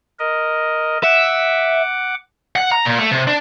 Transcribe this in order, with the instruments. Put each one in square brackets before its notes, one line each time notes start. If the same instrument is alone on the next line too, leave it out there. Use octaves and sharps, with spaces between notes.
[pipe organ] A#4 D#5
[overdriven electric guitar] E5 [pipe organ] F#5 D6
[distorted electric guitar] F#5
A#5
A#2
A3
C3
D4